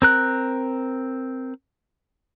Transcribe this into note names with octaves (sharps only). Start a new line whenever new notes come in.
C4 A#4 F#6